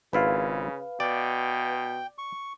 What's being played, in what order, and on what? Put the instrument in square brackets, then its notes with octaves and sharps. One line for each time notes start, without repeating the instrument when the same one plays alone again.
[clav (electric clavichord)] G#1 E4 F4 [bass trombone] C#3 [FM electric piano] B4 F5
[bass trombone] B2 [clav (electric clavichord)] D5 [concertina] G5
[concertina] C#6